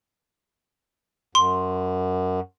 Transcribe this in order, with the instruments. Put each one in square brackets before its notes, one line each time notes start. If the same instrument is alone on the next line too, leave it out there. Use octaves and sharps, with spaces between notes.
[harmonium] F#2 [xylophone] C6